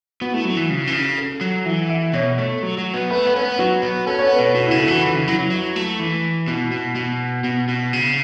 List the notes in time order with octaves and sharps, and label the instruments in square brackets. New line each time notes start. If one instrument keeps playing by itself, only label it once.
[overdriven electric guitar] B3 [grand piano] F#4
[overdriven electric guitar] A3 [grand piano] E4
[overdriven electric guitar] F#3 [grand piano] F#4
[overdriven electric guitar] E3
C#3
E3
C#3
[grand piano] A4
[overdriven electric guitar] F#3
[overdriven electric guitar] E3 [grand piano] E5
[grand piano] E5
[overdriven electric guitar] B2 [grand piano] C#5
[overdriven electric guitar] A3
F#3
F#3
B3
[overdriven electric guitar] A3 [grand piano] B4
[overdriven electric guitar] B3
[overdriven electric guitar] C#4 [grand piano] B4
[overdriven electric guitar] B3
[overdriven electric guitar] F#3 [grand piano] F#4
[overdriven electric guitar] B3
[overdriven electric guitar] C#4 [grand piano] A4
[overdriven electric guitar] B3 [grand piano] C#5
[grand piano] B4
[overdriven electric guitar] B2
[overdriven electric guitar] B2 [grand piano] F#4
[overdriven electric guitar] C#3 [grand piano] E4
[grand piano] A4
[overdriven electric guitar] E3 [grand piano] F#4
[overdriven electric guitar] E3 [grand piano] E4
[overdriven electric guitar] C#3
[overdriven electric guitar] F#3 [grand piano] E4
[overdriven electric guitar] F#3
F#3
A3
E3
[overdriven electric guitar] B2 [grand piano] E4
[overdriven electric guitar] B2
B2
B2
B2
C#3